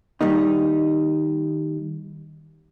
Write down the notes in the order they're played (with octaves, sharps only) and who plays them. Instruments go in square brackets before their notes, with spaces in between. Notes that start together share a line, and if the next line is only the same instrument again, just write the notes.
[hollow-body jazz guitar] D#3 G3 A#3 D#4